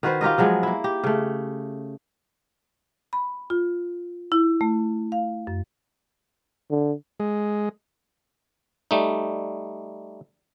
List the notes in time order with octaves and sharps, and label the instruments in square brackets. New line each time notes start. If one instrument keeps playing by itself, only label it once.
[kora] D#3 F#4 B4 C5
F4 G4 A#4 D#5
F3 F#3 G#3 B3
A#3 E4
G4
C#3 A3
[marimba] B5
F4
E4
A3
F5
F#2
[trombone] D3
[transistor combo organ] G#3
[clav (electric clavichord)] G3 A3 D#4